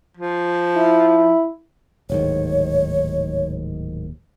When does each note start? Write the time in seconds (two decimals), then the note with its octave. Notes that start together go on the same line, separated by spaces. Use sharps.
0.17 F3
0.77 E4
2.10 D1 D#2 G#2 C#5